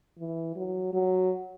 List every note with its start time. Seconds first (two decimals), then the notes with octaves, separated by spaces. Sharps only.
0.18 E3
0.56 F#3
0.93 F#3